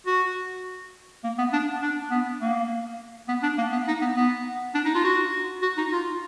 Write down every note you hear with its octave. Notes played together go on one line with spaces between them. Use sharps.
F#4
A#3
B3
D4
D4
B3
A#3
B3
D4
A#3
B3
D#4
B3
B3
D4
D#4
F4
F#4
F#4
D#4
F4